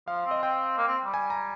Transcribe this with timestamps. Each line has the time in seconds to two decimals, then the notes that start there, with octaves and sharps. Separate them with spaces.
0.08 F3 F5
0.26 C4
0.31 D#5
0.43 C4 G5
0.78 A#3
0.87 C4
1.05 G3
1.14 G#5
1.30 A#5